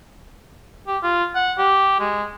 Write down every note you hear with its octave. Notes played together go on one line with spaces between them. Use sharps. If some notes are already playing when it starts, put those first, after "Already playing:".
G4
F4
F#5
G4
G#3